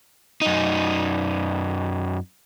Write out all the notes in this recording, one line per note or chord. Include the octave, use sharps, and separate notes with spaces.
F#2 D#4